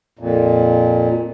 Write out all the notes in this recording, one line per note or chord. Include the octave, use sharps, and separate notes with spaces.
F2 A#2